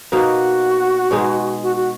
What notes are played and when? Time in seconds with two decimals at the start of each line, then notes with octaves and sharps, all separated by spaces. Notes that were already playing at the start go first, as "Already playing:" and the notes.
0.12 B2 A#3 D#4 F#4
1.11 B2 G#3 D#4 G#4
1.63 F#4
1.76 F#4